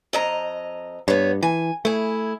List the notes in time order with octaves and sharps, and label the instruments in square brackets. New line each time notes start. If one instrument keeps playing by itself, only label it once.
[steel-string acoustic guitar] F2 D#5 A#5
[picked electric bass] G2 [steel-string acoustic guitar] B3 C#5
[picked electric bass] E3 [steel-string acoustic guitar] G#5
[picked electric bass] A3 [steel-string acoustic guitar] E4 G#4